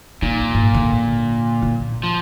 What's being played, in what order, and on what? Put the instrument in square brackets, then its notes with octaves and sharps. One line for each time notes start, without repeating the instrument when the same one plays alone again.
[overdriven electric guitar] A#2 [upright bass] D#4
[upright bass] G#2
D3
F4
[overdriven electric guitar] F3